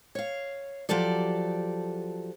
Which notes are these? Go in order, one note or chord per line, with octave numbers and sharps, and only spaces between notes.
C#5 F5
F3 F#3 G4 A4 D5